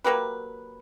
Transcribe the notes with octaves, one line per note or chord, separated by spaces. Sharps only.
F#3 A#3 G4 B4